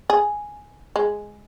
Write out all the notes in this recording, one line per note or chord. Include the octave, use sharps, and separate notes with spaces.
G#4
G#3